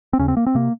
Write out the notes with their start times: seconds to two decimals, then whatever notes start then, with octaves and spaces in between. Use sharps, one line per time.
0.13 C4
0.19 D#2 C#3 C#4
0.28 C4
0.37 A#3
0.46 C4
0.55 C3 A#3